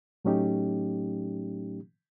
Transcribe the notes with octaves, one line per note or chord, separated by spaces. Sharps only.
A2 F#3 A3 C#4 D#4 G4